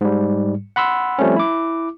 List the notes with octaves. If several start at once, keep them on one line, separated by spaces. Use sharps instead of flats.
G#2 G3
F#5 B5 C6 E6
F3 G3 A3 C4 C#4
E4 D6